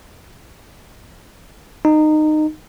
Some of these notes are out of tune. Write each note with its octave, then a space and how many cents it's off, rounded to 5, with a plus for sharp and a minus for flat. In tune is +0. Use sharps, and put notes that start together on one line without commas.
D#4 -20